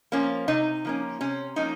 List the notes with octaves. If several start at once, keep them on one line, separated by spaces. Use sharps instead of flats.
F3 A#3 C#4
C3 D#4
F3 A#3 C#4
C3 C#4
F3 A#3 C#4 D#4